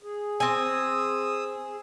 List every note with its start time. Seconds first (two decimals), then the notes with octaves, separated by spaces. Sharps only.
0.03 G#4
0.40 C4 G#5 D#6 E6